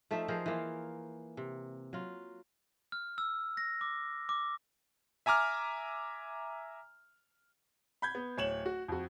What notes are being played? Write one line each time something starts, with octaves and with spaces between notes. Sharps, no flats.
F3 A3 D#4 E5
F3 G#4 A#4 C5
E3 A#3 F4
C3
F#3 F4
F6
E6
A#6
D6
D6
E5 G#5 A#5 D6 F6
B5 G6 G#6
B3
D1 C#5 E7 F#7
F#4
F2 F#4